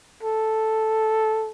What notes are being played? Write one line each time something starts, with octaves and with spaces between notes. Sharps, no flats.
A4